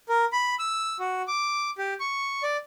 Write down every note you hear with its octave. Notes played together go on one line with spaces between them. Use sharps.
A#4
B5
E6
F#4
D6
G4
C#6
D5